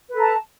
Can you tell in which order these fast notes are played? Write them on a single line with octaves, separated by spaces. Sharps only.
B4 A4 A#5 A5